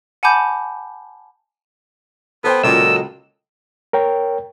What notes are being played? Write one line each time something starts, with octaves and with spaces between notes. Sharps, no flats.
F#5 G#5 A5 B5 D6 G6
B3 A4 C5 G5
C#2 A#2 F#3 A4 D#5 E6
A#4 C#5 G5